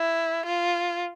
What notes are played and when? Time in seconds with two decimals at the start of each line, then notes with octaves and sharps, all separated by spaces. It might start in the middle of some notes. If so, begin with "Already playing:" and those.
Already playing: E4
0.45 F4